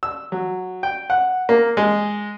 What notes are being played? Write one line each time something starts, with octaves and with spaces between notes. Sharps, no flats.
E6
F#3
G5
F#5
A#3
G#3